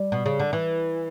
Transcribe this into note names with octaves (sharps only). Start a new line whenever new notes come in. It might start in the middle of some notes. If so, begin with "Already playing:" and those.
Already playing: G3
B2
C#3
D3
E3